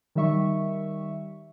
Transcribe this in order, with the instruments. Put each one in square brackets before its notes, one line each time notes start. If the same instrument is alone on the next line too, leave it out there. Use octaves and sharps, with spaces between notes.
[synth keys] D#3 G3 E5 C#6